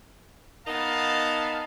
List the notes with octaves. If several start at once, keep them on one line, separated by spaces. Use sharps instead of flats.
B3 D#4 A#4 F5 A5